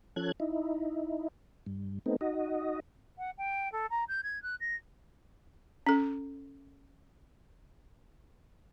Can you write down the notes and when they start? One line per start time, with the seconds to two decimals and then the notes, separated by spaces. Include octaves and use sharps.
0.16 F3 C#4 A4 F#6 G#6
0.40 D#4 E4
1.66 G2
2.06 A3 B3 C4 D#4
2.21 D#4 F#4 D#5
3.18 F#5
3.38 G5
3.72 A4
3.90 A#5
4.08 G6
4.23 G#6
4.43 F#6
4.60 A#6
5.87 C#4 A4